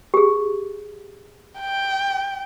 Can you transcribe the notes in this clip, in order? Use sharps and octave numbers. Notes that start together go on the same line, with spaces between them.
G4 G#4
G5